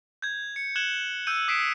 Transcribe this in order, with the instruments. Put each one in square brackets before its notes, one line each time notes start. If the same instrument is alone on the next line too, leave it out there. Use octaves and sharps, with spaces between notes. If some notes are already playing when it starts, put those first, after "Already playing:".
[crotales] G6 G#6
C#7
F#6 G#6 E7 F#7 G7
E6 G6 D#7
D#6 B6 C7 D7 E7